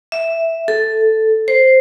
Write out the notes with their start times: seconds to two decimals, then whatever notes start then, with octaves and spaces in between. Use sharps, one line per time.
0.12 E5
0.68 A4
1.48 C5